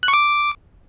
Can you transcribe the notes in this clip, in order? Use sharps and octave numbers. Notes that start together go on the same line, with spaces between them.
F#6
C#6
D6